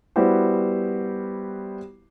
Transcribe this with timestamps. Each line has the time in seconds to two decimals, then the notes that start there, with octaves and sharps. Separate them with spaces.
0.16 G3 B3 E4 F#4 G4 C5